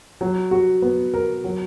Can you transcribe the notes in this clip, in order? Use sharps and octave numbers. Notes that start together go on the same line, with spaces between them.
F#3
F#4
B3
A#4
F#3